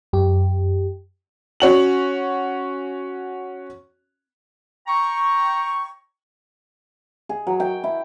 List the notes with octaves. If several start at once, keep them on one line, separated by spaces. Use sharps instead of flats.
F#2 G4
C#4 F#4 F#7
G5 A#5 C#6
G#4
F#3
G5
E4